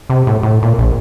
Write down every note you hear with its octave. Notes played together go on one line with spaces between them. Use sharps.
C3
A2
A2
A#2
A#1